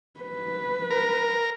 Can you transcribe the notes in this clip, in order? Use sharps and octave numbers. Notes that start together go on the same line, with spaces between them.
B4
A#4